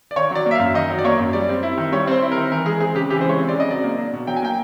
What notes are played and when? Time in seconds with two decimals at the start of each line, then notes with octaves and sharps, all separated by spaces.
0.11 D5
0.16 D#3 C#5
0.31 F#3 D5
0.46 A#3
0.51 E5
0.55 F5
0.60 F#2
0.74 D#3 D#5
0.90 F#3
0.99 D5
1.04 A#3 C#5
1.19 F#2
1.33 G3 D5
1.49 C4
1.63 E4
1.78 D#3
1.92 G3 C#5
2.08 C4 C5
2.22 E4
2.31 A#4
2.36 D#3
2.51 E3 A#4
2.66 G#3 G#4
2.80 C4 G#4
2.95 C#3 G4
3.10 E3 G4
3.21 C5
3.25 G#3 C#5
3.39 C4
3.49 C#3 D5
3.60 D#5
3.68 F#3 D5
3.84 A#3
3.98 D4
4.13 B2
4.27 F#3 G5
4.37 G#5
4.42 A#3 G5